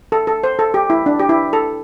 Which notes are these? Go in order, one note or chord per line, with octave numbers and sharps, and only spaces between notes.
A4
A4
C5
A4
G4
E4
D4
G4
E4
A4